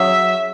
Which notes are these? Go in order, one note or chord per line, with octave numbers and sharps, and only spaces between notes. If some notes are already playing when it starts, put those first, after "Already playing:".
Already playing: F#3 C#4 G#4 C#5 E5